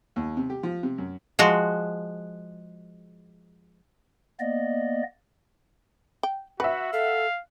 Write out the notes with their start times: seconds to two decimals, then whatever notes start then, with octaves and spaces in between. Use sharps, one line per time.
0.16 D#2
0.37 C3
0.50 G4
0.63 F3
0.83 C3
0.98 F#2
1.39 F3 G#3 F#4
4.40 A#3 B3 D5 D#5
6.23 G5
6.60 F#4 B4 E5 F#5
6.93 A4 F5